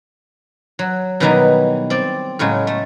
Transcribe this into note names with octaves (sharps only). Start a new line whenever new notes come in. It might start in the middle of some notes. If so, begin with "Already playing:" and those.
F#3
B2 D#3 E3 F#3 G3 D#4
C4 D5
A2 C#3 F#3 G#3
A3